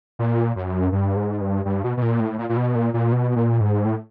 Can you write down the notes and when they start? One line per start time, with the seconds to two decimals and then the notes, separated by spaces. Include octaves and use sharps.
0.19 A#2
0.56 F#2
0.92 G2
1.16 G#2
1.41 G2
1.65 G2
1.84 B2
1.97 B2
2.02 A#2
2.20 A2
2.39 A#2
2.49 A#2
2.57 B2
2.75 A#2
2.94 A#2
3.12 B2
3.36 A#2
3.61 G#2
3.85 A2